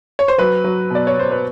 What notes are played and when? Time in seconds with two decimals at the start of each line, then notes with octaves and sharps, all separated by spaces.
0.19 C#5
0.28 C5
0.38 F#3 B4
0.64 F#3
0.90 B2 D5
1.07 C#5
1.17 B2 C5
1.31 B4